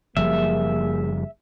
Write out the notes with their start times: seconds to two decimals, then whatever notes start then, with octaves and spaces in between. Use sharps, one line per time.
0.17 F#1 F3 G3 A#3 G#4 E5